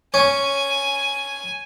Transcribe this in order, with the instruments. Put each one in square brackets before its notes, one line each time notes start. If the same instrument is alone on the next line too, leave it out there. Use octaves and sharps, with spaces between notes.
[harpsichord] C#4 [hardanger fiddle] G#5